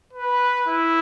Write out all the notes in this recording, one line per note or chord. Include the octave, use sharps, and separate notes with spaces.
B4
E4